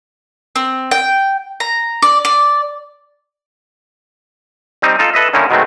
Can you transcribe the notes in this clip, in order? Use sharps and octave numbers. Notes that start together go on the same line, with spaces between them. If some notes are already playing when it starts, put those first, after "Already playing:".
C4
G5
A#5
D5
D5
G3 C4 D#4
D#4 F4 A4
A4 B4 D#5 E5
D3 D#3 A#3 C#4 D#4 E4
B2 D#3 F#3 G#3 A3 C4